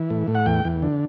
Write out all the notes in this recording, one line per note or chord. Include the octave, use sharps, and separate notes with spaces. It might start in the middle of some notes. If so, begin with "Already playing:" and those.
Already playing: E3
A2
A2
F#5
E2 G5
E2
D3